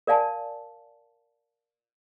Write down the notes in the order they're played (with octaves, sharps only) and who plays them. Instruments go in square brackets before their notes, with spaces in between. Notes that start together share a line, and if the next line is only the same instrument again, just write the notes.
[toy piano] A#4 D5 F5 G#5 A5